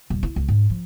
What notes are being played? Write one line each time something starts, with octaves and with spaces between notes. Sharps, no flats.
D#1
E4
C#2
G#2
F3